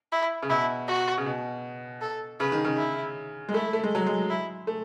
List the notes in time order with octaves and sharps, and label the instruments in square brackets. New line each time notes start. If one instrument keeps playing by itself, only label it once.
[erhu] E4
[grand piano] C#3
[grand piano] B2 [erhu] E4
[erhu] F#4
[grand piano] C#3
B2
[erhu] A4
[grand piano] C#3 [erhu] B4
[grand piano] D#3
C#3
[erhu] E4
[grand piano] G#3
[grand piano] A3 [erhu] E4
[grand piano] A3
G#3
F#3
G#3
[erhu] E4
[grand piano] A3